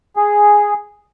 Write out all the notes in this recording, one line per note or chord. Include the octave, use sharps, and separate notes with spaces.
G#4